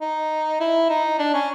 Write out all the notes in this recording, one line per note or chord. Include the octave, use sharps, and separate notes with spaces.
D#4
E4
D#4
D4
C#4